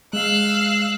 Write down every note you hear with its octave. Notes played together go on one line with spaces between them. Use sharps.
G#3 F5 E6 F#6